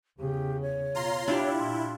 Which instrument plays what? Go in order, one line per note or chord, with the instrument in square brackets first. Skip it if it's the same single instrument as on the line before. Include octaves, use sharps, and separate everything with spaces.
[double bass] E2 C#3 [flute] G4
[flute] C#5
[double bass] B2 [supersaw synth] F4 A#5 C6
[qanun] D4 F4 G4 [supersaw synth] E4
[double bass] A#2 [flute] C6